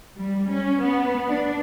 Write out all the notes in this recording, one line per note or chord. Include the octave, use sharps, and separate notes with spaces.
G3
C#4
B3
D4